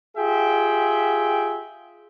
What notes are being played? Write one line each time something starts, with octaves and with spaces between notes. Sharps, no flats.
F4 G4 G#4 E5 G5